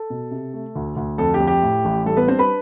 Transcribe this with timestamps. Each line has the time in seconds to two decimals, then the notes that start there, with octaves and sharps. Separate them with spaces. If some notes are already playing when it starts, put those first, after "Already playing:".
Already playing: A4
0.10 B2
0.31 C3
0.53 A3
0.76 D2
0.96 D2
1.18 F2 A4
1.34 G4
1.40 F2
1.47 G4
1.62 A2
1.85 A1
2.06 G3 A4
2.17 B3 B4
2.28 C4 D4 C5
2.39 B4 B5